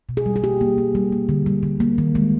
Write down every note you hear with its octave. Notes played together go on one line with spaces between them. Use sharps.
B2
G#4
G3
G#4
A#3 G4
A#3
A#3
G3
A#3
D3
G3
D3
A#3
D#3
G#3